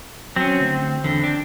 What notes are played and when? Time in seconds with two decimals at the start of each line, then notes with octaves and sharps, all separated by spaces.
0.36 F#3 C4 C#4
0.60 D2
1.04 E2 D3
1.23 D4